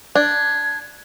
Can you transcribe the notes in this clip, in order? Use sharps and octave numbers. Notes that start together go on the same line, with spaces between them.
D4 G#6